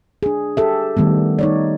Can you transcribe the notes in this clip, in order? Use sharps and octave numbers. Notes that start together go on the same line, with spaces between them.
D4 G#4
G4 A4 E5
D#3 G3 A3 B3
D#4 C#5 D5